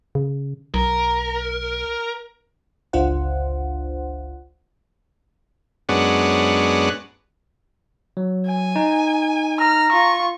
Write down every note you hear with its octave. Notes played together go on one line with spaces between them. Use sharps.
C#3
B1 A#4
G1 C#2 D4 F4 C5 F#5
F#2 G#3 B3 D4 C#5 F#5
F#3
G#5
D#4
A#5 F6
F4 C#6